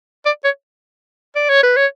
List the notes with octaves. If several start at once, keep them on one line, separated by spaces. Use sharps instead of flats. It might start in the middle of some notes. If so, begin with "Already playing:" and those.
D5
C#5
D5
C#5
B4
C#5